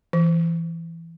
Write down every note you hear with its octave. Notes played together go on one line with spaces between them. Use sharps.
E3